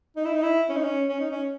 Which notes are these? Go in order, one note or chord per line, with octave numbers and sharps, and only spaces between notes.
D#4
E4
D#4
E4
C#4
D#4
C#4
C#4
D#4
C#4